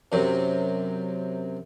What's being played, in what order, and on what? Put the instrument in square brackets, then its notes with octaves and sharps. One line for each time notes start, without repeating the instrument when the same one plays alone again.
[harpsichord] F#2 C3